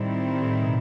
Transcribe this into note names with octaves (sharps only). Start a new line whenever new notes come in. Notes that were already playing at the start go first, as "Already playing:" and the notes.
Already playing: A2 D#3 G3 C4 E4
A2
B2